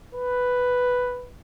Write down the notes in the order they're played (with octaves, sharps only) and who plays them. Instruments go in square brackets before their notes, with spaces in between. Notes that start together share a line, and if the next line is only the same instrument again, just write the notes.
[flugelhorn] B4